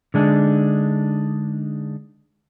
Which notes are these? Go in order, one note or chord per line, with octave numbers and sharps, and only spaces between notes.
D3 G#3 D4 D#4